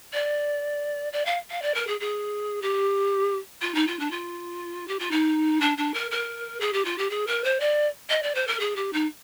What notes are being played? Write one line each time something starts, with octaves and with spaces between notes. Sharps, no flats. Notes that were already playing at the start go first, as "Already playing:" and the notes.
D5
D5
F5
F5
D5
A#4
G#4
G#4
G4
F4
D#4
F4
D4
F4
G4
F4
D#4
D4
D4
A#4
A#4
G#4
G4
F4
G4
G#4
A#4
C5
D5
D#5
D5
C5
A#4
G#4
G4
D#4